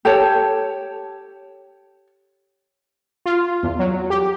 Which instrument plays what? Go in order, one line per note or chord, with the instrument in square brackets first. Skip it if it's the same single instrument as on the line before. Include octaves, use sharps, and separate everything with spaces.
[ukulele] G4 A4 C#5 A5
[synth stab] F4
E2
F#3
G4